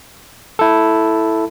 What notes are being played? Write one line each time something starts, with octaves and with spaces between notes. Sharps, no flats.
E4 A4